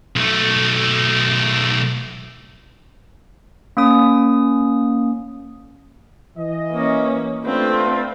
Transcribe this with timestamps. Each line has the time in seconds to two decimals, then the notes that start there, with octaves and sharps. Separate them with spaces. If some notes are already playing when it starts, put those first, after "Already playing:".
0.16 B1 A3
3.77 A#3 C#4 D#6
6.38 E3 D#5
6.72 A#3 C#4
7.45 A3 C4 D4 F4 B4